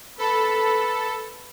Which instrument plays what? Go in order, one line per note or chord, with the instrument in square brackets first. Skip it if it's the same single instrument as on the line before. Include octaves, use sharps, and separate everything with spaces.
[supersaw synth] A4 [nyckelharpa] B4 B5